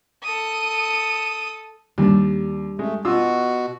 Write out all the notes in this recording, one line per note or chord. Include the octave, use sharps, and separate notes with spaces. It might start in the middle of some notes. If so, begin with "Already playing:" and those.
A4 D#6
D#2 G3 D4
G#3 A3
B2 F4 F#4 E6